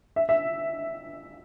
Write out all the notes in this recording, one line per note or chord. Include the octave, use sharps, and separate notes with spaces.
E5
E5